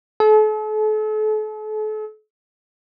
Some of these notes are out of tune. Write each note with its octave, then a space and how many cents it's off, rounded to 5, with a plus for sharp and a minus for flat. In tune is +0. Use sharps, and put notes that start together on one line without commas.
A4 -40